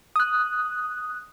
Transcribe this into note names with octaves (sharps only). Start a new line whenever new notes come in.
D#6 F#6